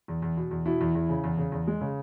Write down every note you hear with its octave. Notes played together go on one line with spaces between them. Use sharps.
E2
E2
B2
E2
B2 E4
E2
E2
C#3
E2
C#3
E2
G#3
C#3